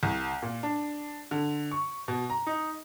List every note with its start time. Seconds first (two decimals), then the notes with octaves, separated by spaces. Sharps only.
0.03 C2
0.42 A#2
0.63 D4
1.31 D3
1.71 C#6
2.08 B2
2.30 A#5
2.47 D#4